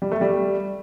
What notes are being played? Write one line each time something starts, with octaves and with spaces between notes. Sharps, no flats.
G3
A3
G3